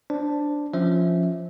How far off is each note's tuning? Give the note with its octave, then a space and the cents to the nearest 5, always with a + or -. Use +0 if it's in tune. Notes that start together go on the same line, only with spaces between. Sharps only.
D4 +0 C5 +0
F3 +0 C#4 +0 E5 -20